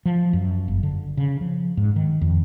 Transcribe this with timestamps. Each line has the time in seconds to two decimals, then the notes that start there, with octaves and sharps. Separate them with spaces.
0.05 F3
0.33 F#2
0.68 G1
0.83 D3
1.17 C#3
1.41 F3
1.77 G#2
1.96 D#3
2.21 F2